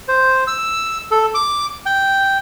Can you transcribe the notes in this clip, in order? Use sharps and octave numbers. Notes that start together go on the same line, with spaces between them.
C5
E6
A4
D6
G5